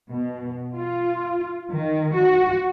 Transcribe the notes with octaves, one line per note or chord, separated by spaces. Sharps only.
B2
F4
D#3
F#4